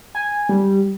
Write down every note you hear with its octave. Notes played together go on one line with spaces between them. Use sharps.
G#5
G3